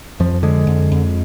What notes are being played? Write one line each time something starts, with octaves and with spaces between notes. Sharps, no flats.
F2 F3
D3 G#3
F2
F2